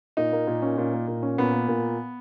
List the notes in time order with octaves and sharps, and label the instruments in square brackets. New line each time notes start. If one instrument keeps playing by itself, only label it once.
[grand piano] A#2 [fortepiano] D#4
[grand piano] A#3
A#2
C#4
A#2
A#3
A#2
C#4
[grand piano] A#2 [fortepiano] B3
[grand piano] A#3
A#2